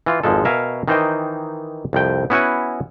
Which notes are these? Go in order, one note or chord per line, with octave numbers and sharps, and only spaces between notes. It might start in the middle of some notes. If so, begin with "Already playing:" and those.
E3 F4
G#1 F2 F3 G#3 A4
B2 A#4 E5 F5 G#5
D#3 E3 D#4 C5 D#5 G5
C2 F2 G5
B3 C#4 E4 F#4 F#5 G#5